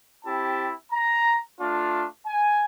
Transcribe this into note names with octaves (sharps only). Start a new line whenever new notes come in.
C4 E4 G4 A5
A#5
A3 D4 F4
G#5